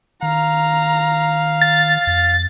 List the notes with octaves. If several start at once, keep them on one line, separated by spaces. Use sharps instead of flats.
D#3 F5 A#5
A6
F2